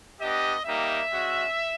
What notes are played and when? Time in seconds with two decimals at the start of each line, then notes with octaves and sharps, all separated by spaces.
0.21 B3 D4 G4 D#5
0.65 G3 A#3 D#4 G4 E5
1.10 G#3 C#4 F#4